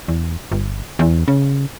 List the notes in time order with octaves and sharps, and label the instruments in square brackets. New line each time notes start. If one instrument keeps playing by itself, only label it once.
[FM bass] E2
G1
E2
C#3